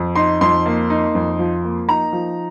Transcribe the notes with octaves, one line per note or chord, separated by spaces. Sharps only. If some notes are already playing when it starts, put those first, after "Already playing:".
Already playing: F2
D#4 C6
F2 C6
A#3
D#4
F2
F3
A#3
D#4 A#5
F3